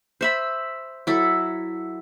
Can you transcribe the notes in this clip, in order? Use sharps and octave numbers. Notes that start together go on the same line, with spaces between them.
C5 E5 B5
F#3 E4 A4